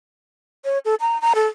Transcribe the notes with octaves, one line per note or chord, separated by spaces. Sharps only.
C#5
A4
A#5
A#5
A4